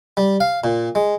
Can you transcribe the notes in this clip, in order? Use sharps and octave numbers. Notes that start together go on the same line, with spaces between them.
G3
F5
A#2
G#3